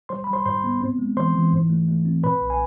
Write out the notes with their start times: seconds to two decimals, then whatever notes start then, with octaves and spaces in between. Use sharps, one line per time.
0.09 G3 C5 C6
0.24 G3 B5
0.33 C5 C6
0.46 G#2 C5 C6
0.64 B3
0.81 C4
0.99 G#3
1.17 E3 C5 C6
1.35 E3
1.52 G#2
1.70 A3
1.88 A3
2.06 C4
2.24 A#2 B4 B5
2.41 B1
2.50 G#5